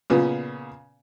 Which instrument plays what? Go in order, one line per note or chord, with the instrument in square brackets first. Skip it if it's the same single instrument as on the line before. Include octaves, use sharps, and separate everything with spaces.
[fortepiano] A#2 C#3 B3